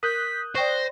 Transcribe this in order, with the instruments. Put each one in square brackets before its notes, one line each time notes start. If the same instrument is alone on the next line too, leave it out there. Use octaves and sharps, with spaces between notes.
[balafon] A#4 [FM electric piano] D#6 F#6 G6 [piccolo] B6
[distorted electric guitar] C5 [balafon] D5 G5 C#6 [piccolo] A#6